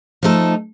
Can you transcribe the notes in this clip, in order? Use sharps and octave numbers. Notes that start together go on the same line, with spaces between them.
F3 A3 D#4 A4